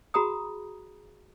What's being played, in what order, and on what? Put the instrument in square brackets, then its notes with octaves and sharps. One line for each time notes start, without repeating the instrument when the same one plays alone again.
[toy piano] F#4 G#4 A#5 B5 D#6